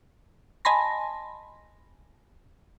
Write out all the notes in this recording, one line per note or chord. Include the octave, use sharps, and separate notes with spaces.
D#5 G#5 A5 B5 C6 A#6